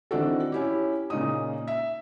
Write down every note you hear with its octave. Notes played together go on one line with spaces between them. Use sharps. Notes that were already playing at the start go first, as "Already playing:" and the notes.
D#3 E3 C4 D4 F#4 A4
C#4 E4 G4
A#2 C#3 D#4 F4 D#6
E5